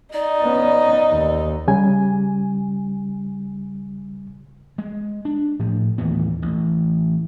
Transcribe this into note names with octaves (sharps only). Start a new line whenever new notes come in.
D#4 D5
B3 C#4
D#2
C#3 G3 G#5
G#3
D4
A2 F3
D#2 A2 E3 B3
A1